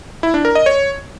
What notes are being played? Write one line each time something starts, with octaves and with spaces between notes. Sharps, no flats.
E4
D4
A#4
D#5
C#5